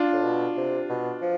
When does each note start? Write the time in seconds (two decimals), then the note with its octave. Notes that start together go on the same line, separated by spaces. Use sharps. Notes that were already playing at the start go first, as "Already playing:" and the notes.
Already playing: D4 F4
0.13 A2
0.24 B2
0.57 C3
0.89 B2
1.22 F3